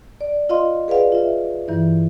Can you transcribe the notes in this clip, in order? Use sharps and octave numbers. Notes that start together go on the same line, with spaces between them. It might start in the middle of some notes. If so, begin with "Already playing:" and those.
D5
F4 D#5 F5 C6
G#4 B4 D5 F5 F#5
F4 E5
G2 E3 E4